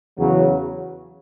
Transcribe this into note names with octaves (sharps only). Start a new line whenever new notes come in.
E2 C#3 F#3